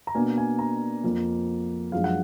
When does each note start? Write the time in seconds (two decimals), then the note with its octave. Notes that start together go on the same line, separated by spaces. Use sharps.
0.07 A#5
0.15 B2 A#3 D4 G#5
0.38 G#5
0.59 A#5
1.04 F2 F3 A#3
1.92 F#2 F3 G#3 D4 F5
2.04 F#5